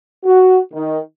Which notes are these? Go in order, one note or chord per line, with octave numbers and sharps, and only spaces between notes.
F#4
D#3